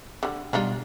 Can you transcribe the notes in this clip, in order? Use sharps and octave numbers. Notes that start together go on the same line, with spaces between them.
D3 G3
B2 G3 D4 D#4 F4